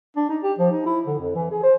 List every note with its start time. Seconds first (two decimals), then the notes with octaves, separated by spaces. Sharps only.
0.17 D4
0.30 D#4
0.43 G4
0.59 F3
0.71 D#4
0.86 E4
1.07 D3
1.19 F2
1.35 E3
1.51 G#4
1.63 C5